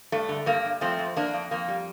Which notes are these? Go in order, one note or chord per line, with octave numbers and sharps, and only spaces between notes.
G2 A3
D3
G2 A#3
G2
F3 A3 C4
F2
F2 A#3 D4
F2
F2 A#3
G3